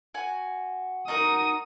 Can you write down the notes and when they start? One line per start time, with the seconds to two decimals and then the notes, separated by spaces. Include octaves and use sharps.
0.14 F#4 G#5
1.08 D#4 F#4 A#4 D#6